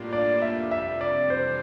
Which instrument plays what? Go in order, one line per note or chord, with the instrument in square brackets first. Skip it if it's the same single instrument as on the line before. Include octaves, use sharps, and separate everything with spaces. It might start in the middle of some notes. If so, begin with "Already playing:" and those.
Already playing: [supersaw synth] A2 G3 A#3 D4 F4
[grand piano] D5
[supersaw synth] F2 C3 G3 [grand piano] E5
[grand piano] E5
D5
[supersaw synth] E3 G3 D4 [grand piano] C5